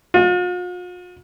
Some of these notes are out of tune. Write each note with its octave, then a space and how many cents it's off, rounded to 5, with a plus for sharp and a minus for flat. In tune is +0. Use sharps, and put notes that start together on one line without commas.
F4 +45